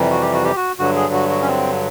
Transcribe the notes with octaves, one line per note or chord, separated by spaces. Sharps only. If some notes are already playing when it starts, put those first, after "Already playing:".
Already playing: F2 C3 E3 G3
F#4
G4
F#4
G4
F#4
G2 D3 F#3 F#4
G#4
F#4
F#4
C#4
C4